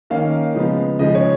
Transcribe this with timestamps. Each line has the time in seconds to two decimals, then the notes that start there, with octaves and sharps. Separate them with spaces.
0.10 D#3 A#3 C#4 F5
0.55 C#3 F3 G#3 B3
0.99 C#3 F3 G#3 D#5
1.15 C#5